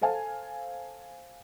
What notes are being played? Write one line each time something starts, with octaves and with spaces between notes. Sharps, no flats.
A4 C5 F5 G#5 A5